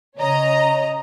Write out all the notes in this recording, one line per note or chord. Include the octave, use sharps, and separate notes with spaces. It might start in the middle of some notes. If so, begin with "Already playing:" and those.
C#3 C#5 D#5 A#5